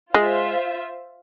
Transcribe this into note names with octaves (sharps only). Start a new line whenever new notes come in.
G#3 F4 C5 E5